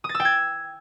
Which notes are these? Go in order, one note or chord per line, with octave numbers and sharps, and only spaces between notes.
D#6
A6
E6
G5
G#6